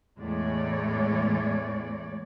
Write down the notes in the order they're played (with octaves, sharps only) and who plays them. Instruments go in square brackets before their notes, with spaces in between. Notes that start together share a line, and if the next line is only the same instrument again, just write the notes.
[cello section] E2 A2 G#3 C#5 D5